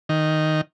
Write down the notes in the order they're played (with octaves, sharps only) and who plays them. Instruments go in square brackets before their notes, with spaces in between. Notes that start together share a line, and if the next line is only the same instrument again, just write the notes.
[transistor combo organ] D#3